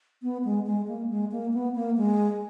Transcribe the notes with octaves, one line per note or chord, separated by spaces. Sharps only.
B3
G#3
G#3
A#3
G#3
A#3
B3
A#3
G#3